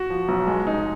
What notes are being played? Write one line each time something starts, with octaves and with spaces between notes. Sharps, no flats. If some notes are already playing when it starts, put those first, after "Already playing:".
Already playing: F#4
F3
B1
G#3
F1 D#4